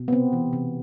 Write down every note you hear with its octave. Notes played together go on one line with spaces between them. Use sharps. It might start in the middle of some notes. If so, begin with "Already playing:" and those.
Already playing: B2
B3
C3 C4
E3
C3